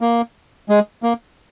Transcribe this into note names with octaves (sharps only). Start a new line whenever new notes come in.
A#3
G#3
A#3